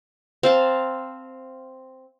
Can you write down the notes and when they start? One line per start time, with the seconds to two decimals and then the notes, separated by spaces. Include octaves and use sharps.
0.43 C4 F5 A5